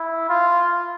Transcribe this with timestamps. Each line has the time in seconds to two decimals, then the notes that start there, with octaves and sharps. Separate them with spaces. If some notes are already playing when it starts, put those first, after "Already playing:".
Already playing: E4
0.29 F4